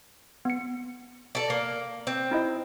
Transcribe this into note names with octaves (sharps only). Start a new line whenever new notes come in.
B3 C#7
A4 D5
A#3
C4
D#4 E4 D#5